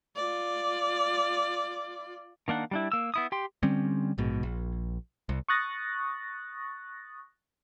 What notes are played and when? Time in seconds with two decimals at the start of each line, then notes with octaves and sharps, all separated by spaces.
0.16 F4 D5
2.48 D#3 A#3 D4 F#5
2.71 G3 D4 E4
2.92 A#3 E6
3.14 B3 E4 D#6
3.32 G4 G5 C6
3.63 D3 G3 C4 C#4
4.18 A#1 G#2 B2
4.43 A#1
5.29 C2
5.49 C#6 D#6 F#6 A6 A#6